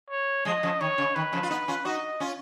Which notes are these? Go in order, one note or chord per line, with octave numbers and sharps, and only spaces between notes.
C#5
F3 G#3 D#5
C#3 F3
D#3 C#5
C#3
D#3 B4
C#3 F3
F4
B3 D#4
C#4 F4
D#4 F#4 D#5
C#4 F4